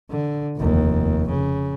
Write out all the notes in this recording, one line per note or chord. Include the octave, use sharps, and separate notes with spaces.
D3
F1 D#2
C#3